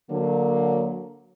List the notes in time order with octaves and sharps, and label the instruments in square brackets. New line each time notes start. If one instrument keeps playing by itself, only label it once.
[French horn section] D3 F#3 A#3